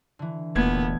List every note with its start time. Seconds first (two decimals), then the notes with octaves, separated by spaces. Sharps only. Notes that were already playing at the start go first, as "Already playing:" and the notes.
0.19 D3 E3
0.56 E1 A#2 A3 B3 E4 G4 G#6